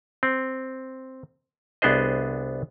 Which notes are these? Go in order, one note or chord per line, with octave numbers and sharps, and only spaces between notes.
C4
C2 B3 D4 G#4 C5 D#5